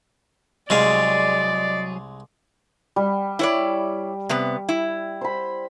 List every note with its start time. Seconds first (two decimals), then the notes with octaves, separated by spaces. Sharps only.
0.70 C2 F#3 G#3 G#4 D5 D#5 F5
2.96 G3
3.39 E4 C#5 D5
4.29 C3 B3
4.69 E4
5.21 C5 B5